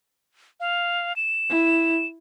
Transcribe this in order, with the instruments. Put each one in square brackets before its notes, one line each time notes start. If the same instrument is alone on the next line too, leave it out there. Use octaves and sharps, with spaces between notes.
[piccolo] F5
E7
[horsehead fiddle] E4